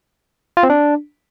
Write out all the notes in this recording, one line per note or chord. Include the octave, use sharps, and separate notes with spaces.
F4
C4
D4